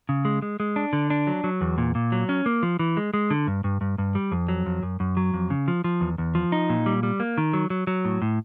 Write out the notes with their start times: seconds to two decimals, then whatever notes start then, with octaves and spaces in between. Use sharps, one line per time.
0.09 C#3
0.25 G#3
0.42 G#3
0.60 G#3
0.76 D4
0.93 D3
1.10 D4
1.27 F#3
1.44 F#3
1.61 E2
1.78 A#2
1.95 A#2
2.12 F#3
2.29 C#4
2.46 A#3
2.63 F3
2.79 E3
2.97 G#3
3.14 G#3
3.31 D3
3.47 G2
3.64 G2
3.81 G2
3.98 G2
4.15 G3
4.32 F2
4.49 F#3
4.66 F2
4.83 F#2
5.00 F#2
5.17 F#3
5.34 F2
5.50 C#3
5.68 F3
5.84 F3
6.01 E2
6.18 E2
6.35 F3
6.52 D#4
6.70 A#2
6.86 G3
7.03 G3
7.20 A#3
7.38 D#3
7.53 F#3
7.70 F#3
7.87 F#3
8.05 A2
8.22 A2